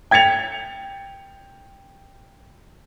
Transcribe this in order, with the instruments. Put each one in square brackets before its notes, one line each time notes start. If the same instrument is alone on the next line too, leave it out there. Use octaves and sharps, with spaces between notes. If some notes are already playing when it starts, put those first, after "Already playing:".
[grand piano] G5 G#6 A6 C#7 F7